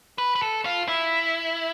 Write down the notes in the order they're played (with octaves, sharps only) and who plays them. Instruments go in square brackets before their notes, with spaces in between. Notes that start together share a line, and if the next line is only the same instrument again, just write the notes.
[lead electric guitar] B4
B4
A4
F4
E4